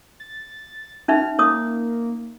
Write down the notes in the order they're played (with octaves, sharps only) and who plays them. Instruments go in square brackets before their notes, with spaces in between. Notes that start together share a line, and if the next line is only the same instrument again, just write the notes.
[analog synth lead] A6
[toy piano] C#4 D#4 E5 [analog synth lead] F6
[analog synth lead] A#3 [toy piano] C#5 D#6